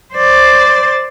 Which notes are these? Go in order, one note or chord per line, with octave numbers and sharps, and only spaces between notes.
C5 D5